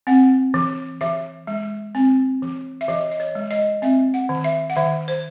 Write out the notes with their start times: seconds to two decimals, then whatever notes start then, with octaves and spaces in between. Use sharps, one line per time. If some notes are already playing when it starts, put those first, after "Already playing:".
0.07 C4 F#5
0.54 E3
1.01 E3 E5
1.47 G#3
1.95 C4
2.42 E3
2.81 E5
2.88 E3 D#5
3.11 D#5
3.20 C#5
3.35 G#3
3.51 D#5
3.82 C4 E5
4.14 F#5
4.29 D#3
4.44 E5
4.70 F#5
4.76 D#3 E5
5.08 C5